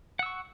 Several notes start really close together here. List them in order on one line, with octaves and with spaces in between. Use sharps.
F#5 E6 C#6